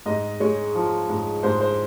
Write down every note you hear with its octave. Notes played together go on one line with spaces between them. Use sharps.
G#2 D#5
G#3 C#5
F3
G#2
G#2 C5
C5